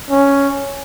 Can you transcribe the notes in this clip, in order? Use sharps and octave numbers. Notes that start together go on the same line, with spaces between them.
C#4